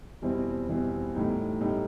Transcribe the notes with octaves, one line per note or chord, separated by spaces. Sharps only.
E2 B2 G3 C4 E4
E2 B2 G3 C4 E4
A2 G3 D#4
A2 G3 D#4